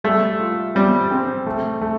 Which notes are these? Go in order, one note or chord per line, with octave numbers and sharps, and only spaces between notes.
G3 A3
F4
G3 C4
C4
A3
A3